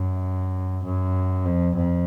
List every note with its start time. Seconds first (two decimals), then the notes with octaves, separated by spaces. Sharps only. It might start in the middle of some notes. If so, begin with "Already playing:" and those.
Already playing: F#2
0.84 F#2
1.45 F2
1.76 F2